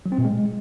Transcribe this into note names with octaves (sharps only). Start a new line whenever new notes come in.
F#3
C4
A#2
G#3